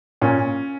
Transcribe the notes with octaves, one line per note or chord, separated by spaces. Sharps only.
A#2 C#4